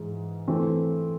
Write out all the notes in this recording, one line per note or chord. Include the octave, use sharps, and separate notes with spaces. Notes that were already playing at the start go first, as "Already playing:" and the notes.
Already playing: G#2 E3 G#3
E3 A3 C4